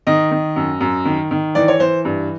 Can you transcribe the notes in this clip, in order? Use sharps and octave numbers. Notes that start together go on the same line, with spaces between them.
D#3 D#5
D#3
F#2
F#2
D#3
D#3
E3 D5
C#5
E3 C5
G2